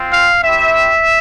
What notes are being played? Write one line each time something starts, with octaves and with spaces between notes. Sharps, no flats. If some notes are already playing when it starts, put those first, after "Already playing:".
Already playing: C4 F4
F5
C4 E4 G4 E5